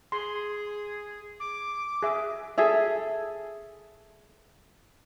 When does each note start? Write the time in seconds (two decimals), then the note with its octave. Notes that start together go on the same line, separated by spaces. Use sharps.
0.12 G#4 C6
1.40 D6
2.03 G#4 E5 D6
2.58 G#4 A4 E5